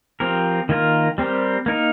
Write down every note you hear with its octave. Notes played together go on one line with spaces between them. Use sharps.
F3 C4 G4 A#4
D#3 A#3 F4 A#4
G3 C4 G4 A#4
A#3 D#4 A#4